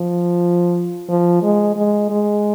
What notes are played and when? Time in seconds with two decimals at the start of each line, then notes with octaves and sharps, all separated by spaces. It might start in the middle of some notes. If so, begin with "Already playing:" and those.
Already playing: F3
1.09 F3
1.43 G#3
1.76 G#3
2.10 G#3